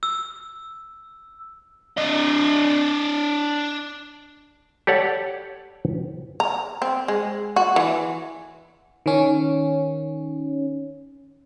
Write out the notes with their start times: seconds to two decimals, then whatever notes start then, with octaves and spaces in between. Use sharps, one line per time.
0.03 E6
1.97 D4 D#5
4.87 G4 A4 C#5 D5 F#5
6.40 A#5
6.82 C4
7.08 G#3
7.56 F#4
7.76 E3
9.06 D#3 C#4